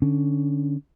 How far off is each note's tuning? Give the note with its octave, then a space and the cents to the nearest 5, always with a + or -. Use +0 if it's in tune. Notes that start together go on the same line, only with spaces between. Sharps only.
D3 +0 C#4 +5